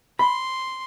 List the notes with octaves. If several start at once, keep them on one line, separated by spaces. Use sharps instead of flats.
B5 C6